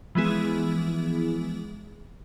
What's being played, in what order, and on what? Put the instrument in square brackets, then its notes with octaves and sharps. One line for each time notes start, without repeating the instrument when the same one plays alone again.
[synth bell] E3 F3 G#3 B3 E4 G#4